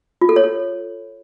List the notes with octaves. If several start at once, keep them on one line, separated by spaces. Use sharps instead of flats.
F4
A4
C#5
A4